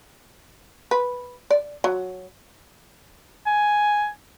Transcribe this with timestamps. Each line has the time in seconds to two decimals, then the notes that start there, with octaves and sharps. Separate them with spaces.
0.91 B4
1.50 D5
1.84 F#3
3.46 G#5